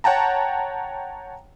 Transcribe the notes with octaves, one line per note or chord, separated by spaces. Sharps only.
C#5 F#5 G5 A5 A#5